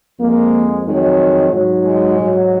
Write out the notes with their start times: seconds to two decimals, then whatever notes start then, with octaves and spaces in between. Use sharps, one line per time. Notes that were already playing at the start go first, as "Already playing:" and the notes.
0.20 F2 F3 G#3 A#3
0.85 F2 D#3 F#3 G#3
1.52 G#2 F#3
1.85 G#3
2.19 G#2 F#3